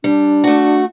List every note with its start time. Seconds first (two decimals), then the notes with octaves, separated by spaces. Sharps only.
0.04 G3 D4
0.44 A3 F#4